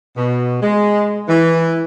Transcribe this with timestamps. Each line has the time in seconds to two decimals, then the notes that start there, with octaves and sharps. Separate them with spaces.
0.16 B2
0.61 G#3
1.28 E3